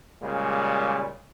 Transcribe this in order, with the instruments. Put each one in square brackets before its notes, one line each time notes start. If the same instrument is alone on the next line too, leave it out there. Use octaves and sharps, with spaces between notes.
[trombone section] A#2 C#3 G3 G#3